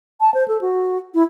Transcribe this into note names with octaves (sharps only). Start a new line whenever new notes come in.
A5
C5
A4
F#4
E4